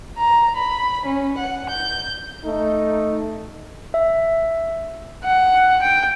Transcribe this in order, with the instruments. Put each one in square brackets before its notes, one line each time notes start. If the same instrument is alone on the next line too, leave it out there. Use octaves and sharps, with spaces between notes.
[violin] A#5
B5
C#4
F#5
G6
[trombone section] A3 D#4
[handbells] E5
[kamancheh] F#5
G5